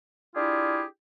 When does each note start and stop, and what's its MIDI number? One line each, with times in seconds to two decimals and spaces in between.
0.35 0.83 62
0.35 0.83 64
0.35 0.83 65
0.35 0.83 67
0.35 0.83 68